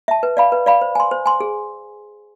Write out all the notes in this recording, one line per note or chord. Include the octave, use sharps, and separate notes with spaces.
E5 A5
B4
D5 F5 B5
B4
D5 F5 B5
C5
G#5 C6
C5
G#5 C6
G#4